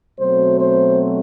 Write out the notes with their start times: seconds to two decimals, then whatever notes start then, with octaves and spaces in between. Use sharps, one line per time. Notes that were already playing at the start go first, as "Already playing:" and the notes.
0.20 B2 F#3 A3 C4 C5
0.58 C5